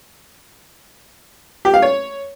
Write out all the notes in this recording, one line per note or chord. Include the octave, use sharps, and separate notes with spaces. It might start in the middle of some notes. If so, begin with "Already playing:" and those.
G4
F5
C#5